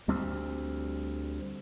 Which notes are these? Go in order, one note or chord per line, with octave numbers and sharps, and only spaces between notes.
D2 G3 C4